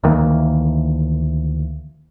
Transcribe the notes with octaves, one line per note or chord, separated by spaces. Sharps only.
D2 D#3 E3 A#3